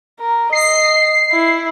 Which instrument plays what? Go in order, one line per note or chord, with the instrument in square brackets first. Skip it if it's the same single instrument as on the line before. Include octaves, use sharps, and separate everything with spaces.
[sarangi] A#4
[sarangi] D#5 [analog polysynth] C7
[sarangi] E4